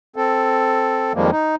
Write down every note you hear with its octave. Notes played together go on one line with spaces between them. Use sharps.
C4 A4
F2 D#3 F3 G3 G#3 A#3
D#4